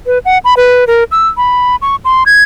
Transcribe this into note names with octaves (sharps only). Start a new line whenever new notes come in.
B4
F#5
B5
B4
A#4
E6
B5
C#6
C6
G#6